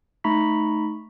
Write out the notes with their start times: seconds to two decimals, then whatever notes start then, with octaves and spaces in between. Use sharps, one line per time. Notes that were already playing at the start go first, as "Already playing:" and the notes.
0.24 A3 D#4 A#5 B5 C#6 B6